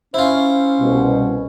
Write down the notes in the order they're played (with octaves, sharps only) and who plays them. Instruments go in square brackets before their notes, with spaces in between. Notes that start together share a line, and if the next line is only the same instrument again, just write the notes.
[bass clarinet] C#4 [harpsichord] E4 F4 [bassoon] C5
[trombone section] C2 B2